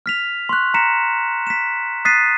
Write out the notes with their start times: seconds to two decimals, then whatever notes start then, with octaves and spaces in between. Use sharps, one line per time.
0.06 F6 B6 F7
0.49 C6 C#6 F#6
0.74 A#5 A#6 B6 C#7 E7
1.47 B6 E7
2.05 D#6 F#6 A6 B6 C7 D#7